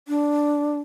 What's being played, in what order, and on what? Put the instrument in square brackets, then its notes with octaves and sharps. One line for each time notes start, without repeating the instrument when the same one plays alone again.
[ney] D4